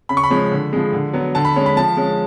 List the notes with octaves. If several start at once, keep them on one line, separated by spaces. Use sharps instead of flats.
C#3 B5
C#6
B5
F3 G#3 C#4
D3
F3 G#3
D3
F#3 B3
D3 A5
B5
G#3 C#4
B5
F3 A5
G#3 C#4